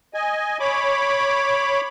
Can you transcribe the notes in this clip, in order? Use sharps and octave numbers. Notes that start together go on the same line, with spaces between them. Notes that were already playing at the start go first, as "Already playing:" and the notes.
D#5 G#5
C#5 B5 D6